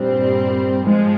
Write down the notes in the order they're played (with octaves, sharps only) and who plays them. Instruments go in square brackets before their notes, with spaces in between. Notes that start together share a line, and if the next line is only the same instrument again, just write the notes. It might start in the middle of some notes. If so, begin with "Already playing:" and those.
Already playing: [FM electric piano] G2 [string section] A#2 G3 C4
[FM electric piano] G#2 [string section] F3 G#3